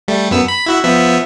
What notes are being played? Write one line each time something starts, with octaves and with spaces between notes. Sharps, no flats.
G3 A3
F#2 B3 E6
B5
E4 F#4 E5
F3 B3 E5